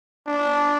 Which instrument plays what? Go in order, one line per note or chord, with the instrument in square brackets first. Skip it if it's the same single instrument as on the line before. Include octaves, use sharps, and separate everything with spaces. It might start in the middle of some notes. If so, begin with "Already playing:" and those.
[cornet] D4